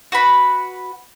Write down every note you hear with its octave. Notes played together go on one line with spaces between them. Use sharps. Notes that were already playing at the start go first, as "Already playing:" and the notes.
F#4 B4 B5